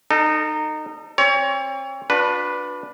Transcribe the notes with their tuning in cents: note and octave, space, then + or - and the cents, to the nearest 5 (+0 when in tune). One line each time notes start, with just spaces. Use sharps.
D#4 -20 A4 +25
C4 +40 C#5 +25
D4 +0 F#4 -45 B4 +0